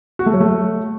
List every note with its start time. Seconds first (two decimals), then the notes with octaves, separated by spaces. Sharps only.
0.19 F#4
0.26 A3
0.33 F#3
0.40 A3